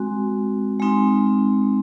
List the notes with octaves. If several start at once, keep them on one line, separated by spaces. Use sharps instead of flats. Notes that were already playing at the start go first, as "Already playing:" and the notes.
Already playing: G#3 C4 F#4
G#3 C4 D#4